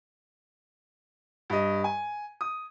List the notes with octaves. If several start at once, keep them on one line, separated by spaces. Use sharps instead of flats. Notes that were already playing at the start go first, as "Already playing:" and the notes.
G2 D#5
G#5
D#6